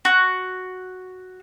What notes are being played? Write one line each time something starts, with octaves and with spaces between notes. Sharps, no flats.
F#4